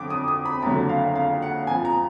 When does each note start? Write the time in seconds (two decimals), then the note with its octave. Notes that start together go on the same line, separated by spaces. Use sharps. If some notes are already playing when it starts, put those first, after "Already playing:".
Already playing: F2 D3 F#3 D6
0.10 D#6
0.28 D#6
0.45 B5
0.62 F#1 F2 D3 F#3 A#5
0.89 F5
1.15 F5
1.42 F#5
1.67 F2 F3 G#5
1.85 A#5